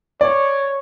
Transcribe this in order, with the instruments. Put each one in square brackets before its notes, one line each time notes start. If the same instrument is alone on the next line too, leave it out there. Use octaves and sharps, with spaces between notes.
[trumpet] C#5 [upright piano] D5